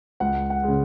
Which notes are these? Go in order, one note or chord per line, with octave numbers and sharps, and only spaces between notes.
C#2 F#5
F#5
C#3 G#3